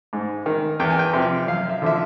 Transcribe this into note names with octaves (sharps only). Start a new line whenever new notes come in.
G#2
D#3
E2 G5
G#5
G5
C3 F3
F#2 F5
E5
D3 F3 E5